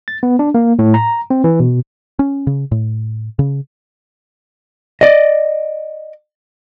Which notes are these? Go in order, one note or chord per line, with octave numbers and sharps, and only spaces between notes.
A6
B3
D4
A#3
A2
A#5
C4
E3
B2
C#4
C#3
A2
C#3
D5 D#5